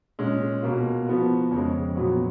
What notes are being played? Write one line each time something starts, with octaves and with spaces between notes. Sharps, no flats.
A#2 G#3 C#4
B2 A#3 F4
F3 B3 F#4
F2 C#3 G#3
A#2 F#3 B3 F#4